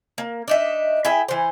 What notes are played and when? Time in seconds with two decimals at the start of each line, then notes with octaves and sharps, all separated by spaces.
0.18 A#3
0.48 D4 D#4 E5
1.05 E4 G#4 E5 G5
1.28 E3 C5